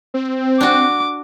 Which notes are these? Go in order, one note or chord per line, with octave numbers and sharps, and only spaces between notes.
C4
D4 F#4 D6